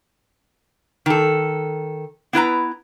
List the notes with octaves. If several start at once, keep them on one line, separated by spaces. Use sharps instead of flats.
D#3 A4
B3 E4 B4 A#5